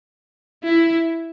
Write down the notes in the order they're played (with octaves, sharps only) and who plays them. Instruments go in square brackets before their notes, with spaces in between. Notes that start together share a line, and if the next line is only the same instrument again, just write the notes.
[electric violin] E4